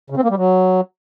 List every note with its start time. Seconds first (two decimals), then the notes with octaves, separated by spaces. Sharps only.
0.10 C#3
0.17 C4
0.24 A#3
0.30 G3
0.37 F#3